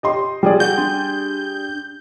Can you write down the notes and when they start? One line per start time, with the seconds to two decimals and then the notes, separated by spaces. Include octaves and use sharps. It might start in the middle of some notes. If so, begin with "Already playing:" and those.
0.03 G4 D#5 C6
0.43 G3 G#4 D5
0.60 F#4 G4 F#5 G6
0.78 D4 G#5 C6